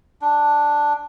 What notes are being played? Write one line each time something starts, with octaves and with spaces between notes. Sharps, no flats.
D4